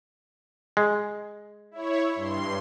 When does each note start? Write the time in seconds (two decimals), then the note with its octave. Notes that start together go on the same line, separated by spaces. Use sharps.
0.77 G#3
1.71 E4 C#5
2.15 G2 C6